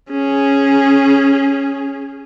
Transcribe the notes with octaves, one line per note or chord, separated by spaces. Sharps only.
C#4 G#4